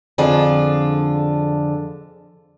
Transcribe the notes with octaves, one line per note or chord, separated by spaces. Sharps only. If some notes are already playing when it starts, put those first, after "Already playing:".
F2 D3 D4 F4 G#4